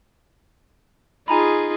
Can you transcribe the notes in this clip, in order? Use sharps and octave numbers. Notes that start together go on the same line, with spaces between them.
D#4 F4 G#4 G#5 A#5 B5